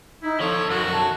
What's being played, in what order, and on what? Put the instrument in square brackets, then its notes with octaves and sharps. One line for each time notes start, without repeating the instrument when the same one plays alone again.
[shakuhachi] D#4 [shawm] E4
[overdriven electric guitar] F2 F3 [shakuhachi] A4 [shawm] C#5
[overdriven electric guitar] F#2 D#3 [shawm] F#4
[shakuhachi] A5